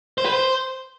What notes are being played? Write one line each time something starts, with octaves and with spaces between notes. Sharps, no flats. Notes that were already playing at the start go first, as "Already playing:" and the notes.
C5
B4
C5